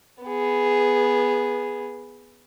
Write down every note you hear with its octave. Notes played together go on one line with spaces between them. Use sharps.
B3 G#4